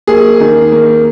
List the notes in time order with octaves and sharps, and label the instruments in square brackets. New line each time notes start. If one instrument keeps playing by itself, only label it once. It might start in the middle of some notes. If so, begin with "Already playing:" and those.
[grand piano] A#3 G#4
D#3
A#3